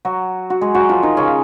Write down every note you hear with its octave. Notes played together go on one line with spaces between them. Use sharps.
F#3 F#4
F#4
G#3 G#4
F#3 F#4
F3 F4
D#3 D#4
C#3 C#4